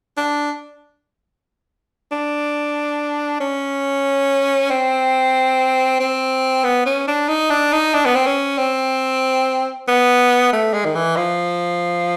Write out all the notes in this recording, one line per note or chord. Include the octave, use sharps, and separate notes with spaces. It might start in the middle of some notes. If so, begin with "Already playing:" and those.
D4
D4
C#4
C4
C4
B3
C#4
D4
D#4
D4
D#4
D4
B3
C4
C#4
C4
B3
A3
G#3
D#3
E3
F3